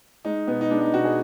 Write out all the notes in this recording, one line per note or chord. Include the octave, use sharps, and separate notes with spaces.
G#3 D#4
B2 B3
D#4
G#3 D4
D#4
B2 F#4
G#4